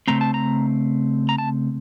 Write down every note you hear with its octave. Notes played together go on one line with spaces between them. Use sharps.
C#3 A3 C4 A#5
A5
A#5
A#5
A5